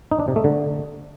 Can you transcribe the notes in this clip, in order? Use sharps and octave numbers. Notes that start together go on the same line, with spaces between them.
D#4
D4
C3
A3
D3